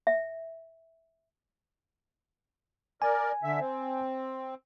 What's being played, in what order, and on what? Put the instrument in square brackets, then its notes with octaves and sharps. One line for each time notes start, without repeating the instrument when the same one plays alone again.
[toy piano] E5
[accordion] A#4 D5 [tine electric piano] G#5
[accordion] D3 E5
C4